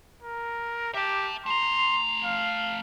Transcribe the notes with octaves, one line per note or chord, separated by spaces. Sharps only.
A#4
G4 E5 A5
A3 A#5 C6
F5